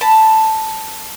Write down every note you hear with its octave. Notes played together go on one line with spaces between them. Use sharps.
A5 B5